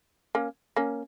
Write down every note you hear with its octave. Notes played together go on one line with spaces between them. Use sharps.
A#3 C#4
A#3 C#4